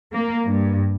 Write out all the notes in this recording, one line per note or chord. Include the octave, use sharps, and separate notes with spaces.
A#3
G2